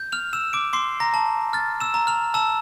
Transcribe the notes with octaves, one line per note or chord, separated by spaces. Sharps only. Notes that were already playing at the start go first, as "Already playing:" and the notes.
Already playing: G6
F6 F7
E6 E7
D6 D7
C6 D6 C7
A#5 A#6
A5
F6 A6
E6 E7
A#5
F6 F7
A5 E6 E7